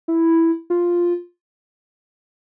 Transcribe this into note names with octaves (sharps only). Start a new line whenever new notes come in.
E4
F4